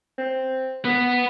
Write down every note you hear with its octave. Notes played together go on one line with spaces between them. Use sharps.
C4
B3 B4 F#5